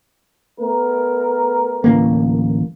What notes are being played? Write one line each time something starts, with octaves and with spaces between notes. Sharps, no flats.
A3 B3 A#4
D1 A1 A#3